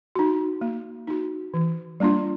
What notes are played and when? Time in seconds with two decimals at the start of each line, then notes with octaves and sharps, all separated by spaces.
0.15 D#4 F#4
0.61 A#3
1.07 D#4 F#4
1.54 E3
2.00 G3 A#3 D4 F4